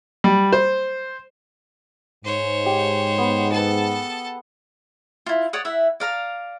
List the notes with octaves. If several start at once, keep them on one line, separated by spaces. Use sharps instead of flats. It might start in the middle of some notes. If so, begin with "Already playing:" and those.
G3
C5
G#2 C5 C#5
G4
B3 B4
G#4 A4 B4 A5
E4 F4
C#5 D5 F#5 D#6
E4 E5 F#5
D5 F5 A#5